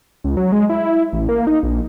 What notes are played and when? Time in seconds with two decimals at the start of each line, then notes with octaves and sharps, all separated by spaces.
0.24 C#2
0.37 F#3
0.52 G#3
0.69 E4
1.13 A1
1.29 A#3
1.47 D#4
1.63 A#1